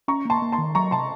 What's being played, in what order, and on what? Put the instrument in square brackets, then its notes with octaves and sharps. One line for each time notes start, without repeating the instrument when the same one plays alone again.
[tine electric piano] C#4 [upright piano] A#5 C#6
[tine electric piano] A#3 [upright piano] A5 C6
[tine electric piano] A#3
[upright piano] A5 C6
[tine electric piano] D#3
[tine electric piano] F#3 [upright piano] A#5 C#6
[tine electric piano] C3 [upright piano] A5 C6